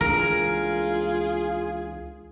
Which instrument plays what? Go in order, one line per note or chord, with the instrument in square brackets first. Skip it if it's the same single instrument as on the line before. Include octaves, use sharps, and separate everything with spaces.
[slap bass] C#2 E3 D4 [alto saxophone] F4 [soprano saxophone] G#4 [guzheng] A#4